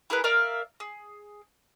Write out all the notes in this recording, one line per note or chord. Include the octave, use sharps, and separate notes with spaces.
E4 G#4 A#4 B4
A#4 D5 E5 F5
G#4